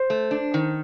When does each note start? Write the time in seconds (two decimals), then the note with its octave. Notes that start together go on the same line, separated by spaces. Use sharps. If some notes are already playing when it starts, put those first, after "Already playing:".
Already playing: C5
0.10 A3
0.31 D4
0.54 D#3